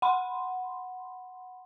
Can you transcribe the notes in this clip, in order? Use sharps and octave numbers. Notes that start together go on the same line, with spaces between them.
F#5 B5 C6